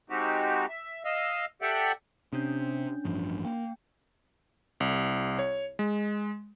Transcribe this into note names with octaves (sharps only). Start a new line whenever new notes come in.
G#3 C4 D#4 F#4 G4
E5
D#5 F5 E6
G4 A4 D5 E5 F#5 G5
C3 C#4 D4 G6
A1 G2 F3
A#3 G5
C2
C#5
G#3